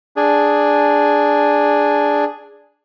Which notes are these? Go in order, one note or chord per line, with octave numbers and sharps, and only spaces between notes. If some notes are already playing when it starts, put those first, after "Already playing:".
D4 G#4